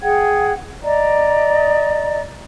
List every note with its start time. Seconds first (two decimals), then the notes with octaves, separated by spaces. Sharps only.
0.01 G#4 F#5 G5 G#6
0.83 D5 D#5 A#5